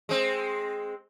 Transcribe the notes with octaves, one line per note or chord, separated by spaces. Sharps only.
G#3 C4